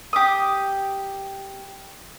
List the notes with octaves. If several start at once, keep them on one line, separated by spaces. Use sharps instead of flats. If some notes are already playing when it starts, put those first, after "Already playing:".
G4 D#6